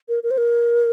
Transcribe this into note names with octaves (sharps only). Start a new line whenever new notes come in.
A#4
A#4
C5
A#4